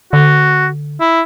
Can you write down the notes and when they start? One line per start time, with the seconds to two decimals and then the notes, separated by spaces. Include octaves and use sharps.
0.13 D3 F#4
1.00 E4